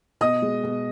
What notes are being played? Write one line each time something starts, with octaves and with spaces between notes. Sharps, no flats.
B2 D#5 D#6
G#3
B2